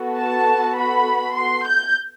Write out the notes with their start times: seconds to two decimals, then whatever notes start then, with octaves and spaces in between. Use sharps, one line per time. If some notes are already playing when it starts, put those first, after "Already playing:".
Already playing: B3 F#4 A4
0.20 A5
0.79 B5
1.36 C6
1.66 G6